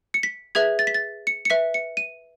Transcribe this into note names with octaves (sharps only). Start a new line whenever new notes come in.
C#7
B6
G#4 B4 E5 G#6
A6
B6
A6
C#7
C#7
B4 E5 B6
C#7
D#7